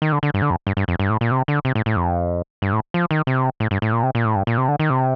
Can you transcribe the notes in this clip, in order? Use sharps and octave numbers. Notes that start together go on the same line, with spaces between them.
D#3
D3
D3
G2
D3
F2
G2
G2
F2
G2
A2
A#2
C3
D3
C3
A2
A2
F2
G2
A2
F3
D#3
C3
A2
G2
A2
A#2
C3
A#2
A2
G2
A#2
C3
D3
D#3
C3